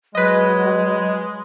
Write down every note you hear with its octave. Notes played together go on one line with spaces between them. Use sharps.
F#3 G#3 B4 D#5